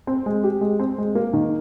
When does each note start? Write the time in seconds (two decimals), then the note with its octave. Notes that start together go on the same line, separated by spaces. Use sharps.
0.07 C4
0.26 G#3
0.44 G4
0.61 G#3
0.79 C4
0.98 G#3
1.15 A#3
1.33 D#3